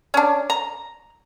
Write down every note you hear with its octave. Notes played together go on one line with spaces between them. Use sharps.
C#4 D4
A#5